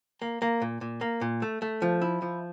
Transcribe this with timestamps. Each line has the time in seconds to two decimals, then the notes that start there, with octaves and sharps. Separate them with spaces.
0.22 A#3
0.42 A#3
0.62 A#2
0.81 A#2
1.01 A#3
1.21 A#2
1.42 A3
1.62 A3
1.82 F3
2.02 E4
2.22 F3